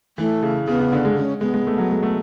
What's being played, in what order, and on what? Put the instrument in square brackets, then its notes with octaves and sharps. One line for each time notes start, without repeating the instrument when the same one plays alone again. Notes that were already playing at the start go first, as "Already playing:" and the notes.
[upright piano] E3 [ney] A3
[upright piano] C#3
[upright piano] C#3 [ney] B3
[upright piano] C#3
D3
G#3
[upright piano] G#3 [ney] C#4
[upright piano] G#3 [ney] B3
[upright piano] G#3
A3
F#3
G#3
A3